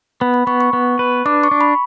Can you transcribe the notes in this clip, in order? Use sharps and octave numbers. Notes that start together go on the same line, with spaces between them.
B3 B5
B5
B3 C#6
C#6
B3
B4
D4 D6
C#6
D4
B5